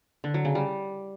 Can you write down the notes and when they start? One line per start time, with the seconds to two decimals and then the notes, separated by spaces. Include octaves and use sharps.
0.24 D3
0.34 F#3
0.45 C#3
0.55 G3